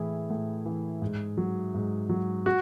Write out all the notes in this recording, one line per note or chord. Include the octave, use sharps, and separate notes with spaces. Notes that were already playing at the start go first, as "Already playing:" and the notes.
Already playing: A2 E3 E4 G#4
A2
E3
G#2
F#3
G#2
F#3
F#4